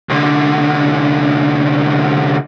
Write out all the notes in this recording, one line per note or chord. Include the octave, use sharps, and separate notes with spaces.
C2 D3